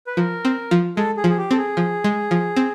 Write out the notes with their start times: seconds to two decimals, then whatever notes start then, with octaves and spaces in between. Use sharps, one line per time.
0.07 B4
0.17 F3 A#4
0.45 C4
0.71 F3
0.97 G#3 A4
1.17 G#4
1.24 F3
1.29 G#4
1.38 G4
1.51 C4 A4
1.58 G#4
1.77 F3
2.04 G#3
2.31 F3
2.56 C4